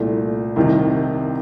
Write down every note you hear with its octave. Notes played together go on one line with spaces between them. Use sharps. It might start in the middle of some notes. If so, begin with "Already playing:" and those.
Already playing: C2 A#2 A3
C2 C3 D#3